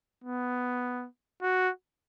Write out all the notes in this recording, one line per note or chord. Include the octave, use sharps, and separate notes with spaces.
B3
F#4